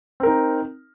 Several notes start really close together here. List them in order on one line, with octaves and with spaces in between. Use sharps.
C4 A#4 D#4